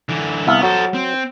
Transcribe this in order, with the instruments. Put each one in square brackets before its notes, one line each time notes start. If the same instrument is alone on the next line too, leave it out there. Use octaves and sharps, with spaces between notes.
[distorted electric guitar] D3 E3
[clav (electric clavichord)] C2 E5 F5 [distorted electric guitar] B3
[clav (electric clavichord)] F#3 [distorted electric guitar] A4 C5
[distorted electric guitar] C4